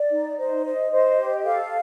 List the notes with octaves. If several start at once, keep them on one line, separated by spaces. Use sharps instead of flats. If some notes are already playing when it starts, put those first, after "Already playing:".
Already playing: D5
D#4
C5 D#5
C5
C5
G4
A4 F5